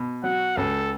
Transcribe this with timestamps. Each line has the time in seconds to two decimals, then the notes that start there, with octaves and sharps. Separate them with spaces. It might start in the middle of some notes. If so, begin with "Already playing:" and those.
Already playing: B2
0.24 F#3 F#5
0.57 C#2 A4